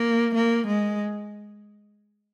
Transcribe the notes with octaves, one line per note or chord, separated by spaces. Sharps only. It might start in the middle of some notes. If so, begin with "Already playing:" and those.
Already playing: A#3
A#3
G#3